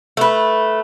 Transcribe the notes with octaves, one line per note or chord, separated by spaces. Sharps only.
A3 B4